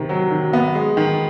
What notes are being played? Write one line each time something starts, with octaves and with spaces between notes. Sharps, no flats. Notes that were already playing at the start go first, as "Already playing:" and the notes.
Already playing: C3 D#3
F#3
D#3
B3
G#3
D#3